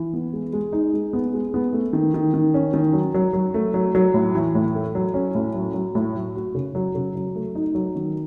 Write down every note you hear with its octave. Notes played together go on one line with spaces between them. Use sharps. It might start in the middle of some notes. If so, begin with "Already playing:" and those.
Already playing: E3
B3
G#3
G#3
D#4
G#3
B3
G#3
B3
A3
D#3
D#3
D#3
C#4
D#3
F#3
F#3
F#3
A3
F#3
F#3
A2
E3
A2
A3
F#3
C#4
A2
F#3
F#3
A2
F#3
F#4
C#3
F#3
C#3
F#3
A3
D#4
F#3
D#3